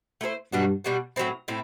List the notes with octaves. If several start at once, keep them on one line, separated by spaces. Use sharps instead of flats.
A3 E4 A4 C5
G2 B2 G3 D4 F#4
B2 G3 D4 F#4
A2 F#3 C4 E4
A2 C4 E4